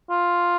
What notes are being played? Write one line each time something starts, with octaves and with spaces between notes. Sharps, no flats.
F4